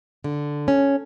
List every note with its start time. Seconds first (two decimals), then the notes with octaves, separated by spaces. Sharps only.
0.24 D3
0.68 C#4